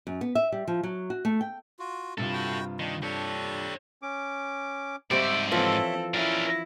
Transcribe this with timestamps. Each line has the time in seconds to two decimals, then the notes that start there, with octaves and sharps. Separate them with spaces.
0.07 F#2
0.21 B3
0.35 E5
0.52 G3
0.68 F3
0.83 F#3
1.10 F#4
1.25 A3
1.41 G5
1.79 F4 F#4
2.18 G2 C3 E4 F4 A4
2.33 F#4 G5
2.79 D#3 D4
3.02 D4 G4 A4 C#5
4.02 C#4 D6
5.11 G#2 G3 C4 C5 D5 E5 C#6 E6
5.52 E3 F3 C4 F4 A4 C#5 E5
6.14 C#4 D4 E4 A#4